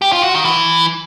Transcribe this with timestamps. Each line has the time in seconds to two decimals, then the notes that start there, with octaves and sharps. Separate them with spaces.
0.02 G4
0.12 F4
0.23 F#4
0.34 D#3
0.45 E3